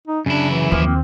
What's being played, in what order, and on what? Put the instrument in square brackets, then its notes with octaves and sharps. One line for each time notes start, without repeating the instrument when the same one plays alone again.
[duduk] D#4
[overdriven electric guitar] F#2 E4 [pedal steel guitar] C#3 [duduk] D4
[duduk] E3
[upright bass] D#2 [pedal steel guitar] F3 A#3
[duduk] C4